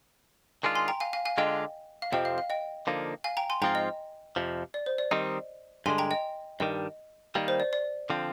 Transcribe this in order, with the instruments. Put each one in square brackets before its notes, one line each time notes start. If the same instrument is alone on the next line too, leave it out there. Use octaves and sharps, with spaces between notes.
[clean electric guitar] D#3 G#3 D4 F4
[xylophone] G#5 C6
G5 A#5
F5 G#5
F5 G#5
F5 G#5
[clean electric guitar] D3 G#3 D4 F4 [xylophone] D#5 G5
[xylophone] F5
[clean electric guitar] F2 C3 F3 C4 [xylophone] D#5 G5
[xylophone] F5
F5
D#5 G5
[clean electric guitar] D3 F3 A#3 D#4
[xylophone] F5 G#5
G5 A#5
G#5 C6
[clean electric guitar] G#2 F3 C4 F4 [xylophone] G5 A#5
[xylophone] D#5
[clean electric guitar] F2 C3 F3
[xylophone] D5
C5
D5
[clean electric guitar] D#3 G3 C4 D#4 [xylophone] D#5
[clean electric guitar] G2 D3 G#3 [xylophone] G#5 C6
[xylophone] G5 A#5
D#5 G5
[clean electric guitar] G2 D#3 G3 [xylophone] D#5
[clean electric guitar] D#3 G3 A#3 [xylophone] D5
[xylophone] C5
D5
D5
[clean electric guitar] D3 F3 C4